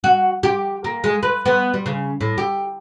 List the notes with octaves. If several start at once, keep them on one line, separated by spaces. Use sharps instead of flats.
F#4
G4
A#3
G#3
B4
B3
G3
C#3
A2
G4